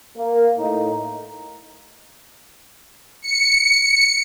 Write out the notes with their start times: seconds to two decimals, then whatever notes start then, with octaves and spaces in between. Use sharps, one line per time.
0.17 A#3
0.58 A2 D#4
3.21 C#7